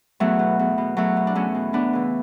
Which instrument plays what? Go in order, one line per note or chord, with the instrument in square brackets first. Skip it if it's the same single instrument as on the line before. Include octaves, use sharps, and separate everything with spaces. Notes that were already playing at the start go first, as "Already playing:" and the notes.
[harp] E2 F#3 A3
B2
E2
B2
E2 F#3 A3
B2
D4
E2 A3 C#4
B2
F#2 B3 D4
C#3 E3